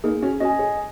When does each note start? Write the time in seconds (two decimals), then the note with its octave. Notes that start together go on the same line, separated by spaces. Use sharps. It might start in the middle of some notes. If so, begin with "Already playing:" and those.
0.04 A#3 D#4 G#4
0.22 C#4 F#4
0.40 C#4 F#4 D#5
0.45 G#5
0.59 G#4 C#5